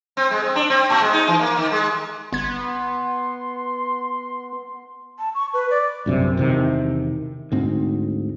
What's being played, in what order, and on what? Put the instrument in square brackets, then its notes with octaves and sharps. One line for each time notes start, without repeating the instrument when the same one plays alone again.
[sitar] C4
G#3
C4
D4
C4
A#2
G#3
D#4
E3
A#3
D#3
G#3
[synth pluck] G1 G#6 [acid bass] B3 [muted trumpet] C6
[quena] A5
C#6
B4
D5
[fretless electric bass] A#1 F#2 C3
E1 C3 D#3
D2 G#2 C4